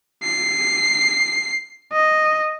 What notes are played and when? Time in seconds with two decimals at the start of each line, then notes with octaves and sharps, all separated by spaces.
0.23 C7
1.93 D#5